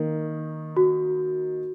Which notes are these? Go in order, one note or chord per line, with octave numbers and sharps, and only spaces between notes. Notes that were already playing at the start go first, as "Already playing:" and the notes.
Already playing: D#3 A#3 D#4
F#4